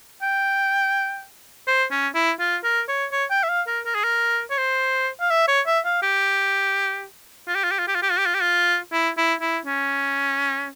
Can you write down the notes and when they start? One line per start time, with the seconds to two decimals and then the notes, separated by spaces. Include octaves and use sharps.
0.22 G5
1.67 C5
1.91 C#4
2.15 E4
2.40 F4
2.64 A#4
2.88 C#5
3.12 C#5
3.30 G5
3.43 E5
3.49 F5
3.67 A#4
3.85 A#4
3.95 G#4
4.04 A#4
4.50 C#5
4.57 C5
5.21 F5
5.30 E5
5.48 C#5
5.67 E5
5.85 F5
6.03 G4
7.48 F4
7.55 G4
7.63 F4
7.71 G4
7.79 F4
7.88 G4
7.95 F4
8.03 G4
8.11 F4
8.19 G4
8.26 F4
8.34 G4
8.42 F4
8.92 E4
9.17 E4
9.41 E4
9.66 C#4